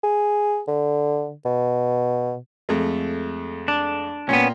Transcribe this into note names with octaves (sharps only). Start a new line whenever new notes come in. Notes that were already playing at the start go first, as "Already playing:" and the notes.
G#4
D3
B2
F2 G#3 A3
D4
A#2 B3 C#4 G5